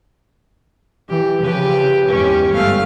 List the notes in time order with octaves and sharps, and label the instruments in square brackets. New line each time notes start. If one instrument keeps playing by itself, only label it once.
[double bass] E3 [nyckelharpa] G4
[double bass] C#3 F3 [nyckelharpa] G4 B4
[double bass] E2 G#2 [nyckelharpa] C#4 G4
[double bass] G1 [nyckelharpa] A3 F5